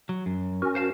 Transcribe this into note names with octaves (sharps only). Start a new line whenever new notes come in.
F#3
F#2
C#4 F#4 A#4
C5 F5 A5